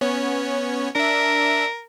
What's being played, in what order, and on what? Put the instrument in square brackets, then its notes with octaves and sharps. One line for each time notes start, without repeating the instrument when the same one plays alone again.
[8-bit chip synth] B3 C#4 C#5
[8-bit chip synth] D4 E5 [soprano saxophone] A#4